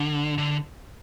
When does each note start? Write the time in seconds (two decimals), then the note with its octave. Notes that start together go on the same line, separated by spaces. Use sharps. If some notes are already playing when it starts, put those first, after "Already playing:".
Already playing: D3
0.38 D3